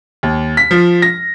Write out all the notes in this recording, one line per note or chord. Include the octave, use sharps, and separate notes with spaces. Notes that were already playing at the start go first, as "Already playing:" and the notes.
D#2
B6
F3
A#6